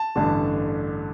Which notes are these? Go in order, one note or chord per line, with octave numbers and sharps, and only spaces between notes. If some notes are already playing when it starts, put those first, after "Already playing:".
Already playing: A5
A1 G2 D3 A3